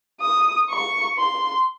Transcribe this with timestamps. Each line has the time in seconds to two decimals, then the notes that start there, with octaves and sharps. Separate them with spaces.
0.21 D#6
0.70 C#6
1.17 C6